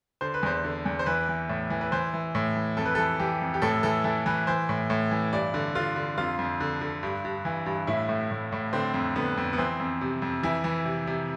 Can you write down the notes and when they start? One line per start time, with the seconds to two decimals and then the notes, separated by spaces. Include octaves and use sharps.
0.21 D3 C5
0.34 B4
0.43 E2 C5
0.64 D3
0.85 E2
0.99 C5
1.06 E3 B4
1.28 E3
1.49 A2
1.70 E3
1.81 B4
1.92 E3 C5
2.13 E3
2.35 A2
2.55 E3
2.77 F2 A4
2.85 B4
2.95 E3 A4
3.19 E3 G4
3.41 F2
3.54 G4
3.62 A2 A4
3.83 E3 A4
4.04 E3 A4
4.26 E3 B4
4.47 E3 C5
4.69 A2
4.90 A2
5.11 E3
5.33 G2 D5
5.54 D3
5.75 D3 F4
5.96 D3
6.18 F2 F4
6.39 F2
6.60 D3
6.81 D3
7.03 G2
7.25 G2
7.45 E3
7.66 G2
7.87 A2 E4
8.09 A2
8.31 A2
8.52 A2
8.73 D3 C4
8.94 F2
9.16 D3 B3
9.37 F2
9.53 B3
9.58 E3 C4
9.80 F2
10.01 C3
10.22 F2
10.43 E3 E4
10.64 E3
10.85 C3
11.07 C3